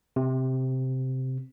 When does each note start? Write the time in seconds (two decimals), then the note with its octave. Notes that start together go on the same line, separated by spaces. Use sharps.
0.16 C3